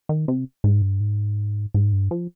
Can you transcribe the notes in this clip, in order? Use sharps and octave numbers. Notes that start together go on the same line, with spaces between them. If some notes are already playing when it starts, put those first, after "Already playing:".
D#3
C3
G#2
G2
G#2
G#2
G2
F3